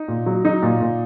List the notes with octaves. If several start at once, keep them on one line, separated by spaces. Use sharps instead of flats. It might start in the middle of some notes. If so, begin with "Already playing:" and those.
Already playing: D#4
A#2
F#3
F#3 D#4
A#2
A#2